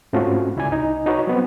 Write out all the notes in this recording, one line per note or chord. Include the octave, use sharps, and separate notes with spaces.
G#2 A3 C4 C#4 F4 F#4
C#2 E4 D5 G#5
C2 D#4
D#4 F#4 B4 C#5
F#3 B3 C4